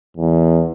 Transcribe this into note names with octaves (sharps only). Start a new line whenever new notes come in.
E2